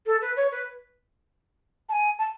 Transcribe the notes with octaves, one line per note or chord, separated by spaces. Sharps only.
A4
B4
C#5
B4
A5
G#5
A5